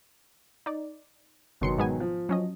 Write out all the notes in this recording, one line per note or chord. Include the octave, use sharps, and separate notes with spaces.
D#4 D5
G1 B2 D#3 F#3 C6 C#7
G#2 B3 G#5
F3
F#3 C#4 D#5